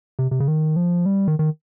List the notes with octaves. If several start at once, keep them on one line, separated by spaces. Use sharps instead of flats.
C3
C3
C#3
D#3
F3
G3
D#3
D#3